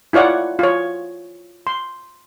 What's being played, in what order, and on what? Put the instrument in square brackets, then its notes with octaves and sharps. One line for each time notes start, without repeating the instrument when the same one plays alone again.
[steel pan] E4 F4 C#5 D5 F#5
F4 C#5
C6